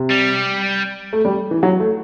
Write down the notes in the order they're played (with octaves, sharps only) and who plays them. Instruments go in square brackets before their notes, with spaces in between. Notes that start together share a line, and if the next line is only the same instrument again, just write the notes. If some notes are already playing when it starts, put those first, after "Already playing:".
Already playing: [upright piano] C3
[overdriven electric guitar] G3
[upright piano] A3
G3
E3
F#3
A3